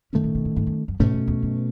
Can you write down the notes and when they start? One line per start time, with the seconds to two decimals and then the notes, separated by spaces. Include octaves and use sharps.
0.13 F#2 D#3 A3 C#4
0.24 A2
0.35 B2
0.45 A2
0.56 G#2
0.67 F#2
0.88 F#2
1.00 G#2 B2 A3 C#4
1.13 F#2
1.28 E2
1.43 F#2